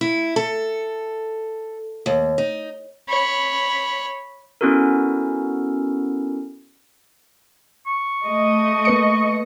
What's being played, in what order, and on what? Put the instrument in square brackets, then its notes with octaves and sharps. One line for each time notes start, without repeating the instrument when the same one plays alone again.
[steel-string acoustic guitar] E4
A4
D#2
D#4
[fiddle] C#5 B5
[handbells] B3 C#4 E4 F#4 A4 A#4
[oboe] C#6
[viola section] A3 D#5
[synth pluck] A#3 B4 C#7